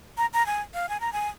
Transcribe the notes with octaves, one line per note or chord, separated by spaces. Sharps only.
A#5
A#5
G#5
F5
G#5
A#5
G#5